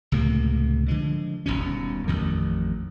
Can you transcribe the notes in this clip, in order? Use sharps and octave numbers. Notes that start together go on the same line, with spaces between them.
C#2 A2 C3 A#3
D3 F3 G#3
D#1 G#1 B2 C#4
A1 F2 D#3